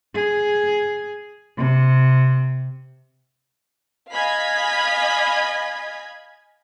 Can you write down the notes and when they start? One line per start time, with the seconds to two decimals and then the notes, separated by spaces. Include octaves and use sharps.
0.14 G#4
1.57 C3
4.12 D#5 F5 G#5 B5 G#6 B6